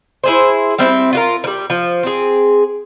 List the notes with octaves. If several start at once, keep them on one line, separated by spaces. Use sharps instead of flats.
E4 G#4 C5
G3 C4 E4
F4 F#4 A#4
F3 G3
F3
C4 G#4